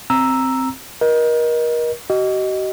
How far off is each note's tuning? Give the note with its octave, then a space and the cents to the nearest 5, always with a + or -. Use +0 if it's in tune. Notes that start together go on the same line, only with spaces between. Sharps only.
C4 +0 A#5 +0 E6 +0
A#4 +35 D#5 +0
F#4 +45 D#5 +0